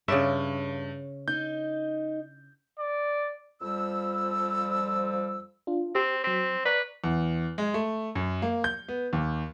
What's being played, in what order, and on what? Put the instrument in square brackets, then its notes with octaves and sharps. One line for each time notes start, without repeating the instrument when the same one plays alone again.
[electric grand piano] G2 [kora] C#3 D5 E5 [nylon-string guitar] C#5
[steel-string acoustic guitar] D#4 [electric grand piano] G6
[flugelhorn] D5
[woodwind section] F2 F3 G3 E6
[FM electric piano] D4 F4
[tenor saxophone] C4 [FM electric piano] G4
[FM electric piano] F#3 B6 [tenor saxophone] C4
[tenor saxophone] B4 [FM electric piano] D5 A#5 C#6
[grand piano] E2
G#3
A3
F#2
A#3
G6
B3
D#2